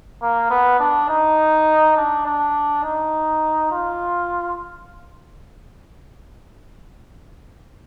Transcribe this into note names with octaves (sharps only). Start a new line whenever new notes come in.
A#3
B3
D4
D#4
D4
D4
D#4
F4